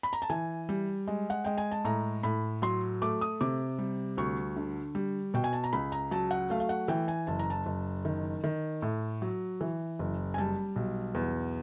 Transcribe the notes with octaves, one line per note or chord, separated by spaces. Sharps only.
B5
A#5
A5
E3 G#5
G3
G#3
F#5
G#3 G5
G#5
A5
A2 A#5
A2 B5
F#3 C6
A3 D6
D#6
C3 D6
G3
D2 C#6
D3
G3
B2 G5
G#5
A5
A#5
C#2 B5
A#5
F#3 A5
F#5
A3 F5
F5
F#5
E3 G5
G#5
F#1 A5
A#5
A5
F#1
D#3
D#3
A2
F#3
E3
F#1
G#5
G3 A5
B1
E2